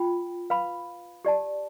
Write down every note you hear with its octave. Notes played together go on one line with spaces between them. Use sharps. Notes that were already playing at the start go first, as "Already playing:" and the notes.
Already playing: F4 G5 B5
B4 F5 B5
G4 D5 A5